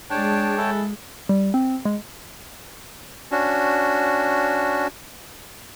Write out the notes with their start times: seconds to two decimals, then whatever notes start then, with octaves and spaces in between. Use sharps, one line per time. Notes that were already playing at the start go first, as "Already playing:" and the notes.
0.10 G#3 D4 C#5 G5 A5
0.57 E3 E4 A4
1.29 G3
1.54 C4
1.85 G#3
3.31 C#4 D4 F#4